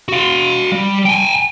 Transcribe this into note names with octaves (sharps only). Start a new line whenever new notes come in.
F#4 F5
G3
G5 G#5